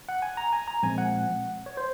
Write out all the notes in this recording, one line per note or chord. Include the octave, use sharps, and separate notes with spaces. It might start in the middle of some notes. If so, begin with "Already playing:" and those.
F#5
G#5
A#5
G#5
A#5
A#2 F3 G#3 C4 G#5
F#5
C#5
C5